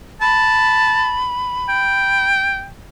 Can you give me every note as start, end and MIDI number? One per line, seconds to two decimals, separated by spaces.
0.22 1.22 81
0.22 2.26 83
1.69 2.67 79